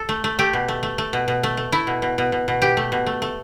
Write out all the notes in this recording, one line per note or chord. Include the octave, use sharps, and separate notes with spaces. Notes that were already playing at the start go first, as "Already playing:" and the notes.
Already playing: A4
A3
A3
A3 G4
B2
A3
A3
A3
B2
B2
A3
A3
A3 E4
B2
B2
B2
B2
B2
B2 G4
A3
B2
A3
A3